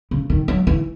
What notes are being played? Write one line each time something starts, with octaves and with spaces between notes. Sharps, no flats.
C#3
D#3
F#3
E3